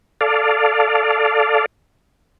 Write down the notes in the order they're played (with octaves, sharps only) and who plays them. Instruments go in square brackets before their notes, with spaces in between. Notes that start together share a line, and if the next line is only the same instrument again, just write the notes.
[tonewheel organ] A4 D5 F5